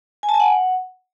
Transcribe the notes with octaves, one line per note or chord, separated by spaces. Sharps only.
G#5
A5
G#5
F#5